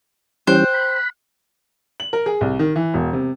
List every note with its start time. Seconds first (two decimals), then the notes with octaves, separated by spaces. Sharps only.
0.47 E3 G3 C#4 C5 G5 F#6
0.73 B5
2.00 F#7
2.13 A#4
2.26 G#4
2.41 C2
2.59 D#3
2.76 E3
2.94 E1
3.13 C3